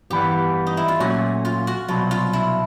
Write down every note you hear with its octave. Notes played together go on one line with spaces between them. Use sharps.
G2 E3 G3 B3 G4
D#4
E4
F4
A#2 F#3 A3 C#4 F#4
F4
F#4
C2 B2 F#3 F4
F4
E4